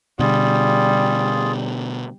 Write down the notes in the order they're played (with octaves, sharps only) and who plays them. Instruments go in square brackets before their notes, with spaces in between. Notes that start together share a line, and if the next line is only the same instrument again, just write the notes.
[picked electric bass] B2 D3 [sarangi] G3 [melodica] F4 G#4